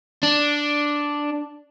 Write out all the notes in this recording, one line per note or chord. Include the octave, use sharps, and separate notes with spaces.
D4